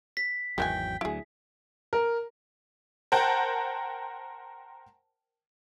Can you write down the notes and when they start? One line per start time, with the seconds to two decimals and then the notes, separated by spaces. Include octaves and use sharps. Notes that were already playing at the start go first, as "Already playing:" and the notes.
0.17 B6
0.58 G#1 E2 D#3 E3 F#3 G5 G#5
1.01 D2 F#3 E4 G#4
1.93 A#4
3.12 A#4 C5 F#5 G5 A5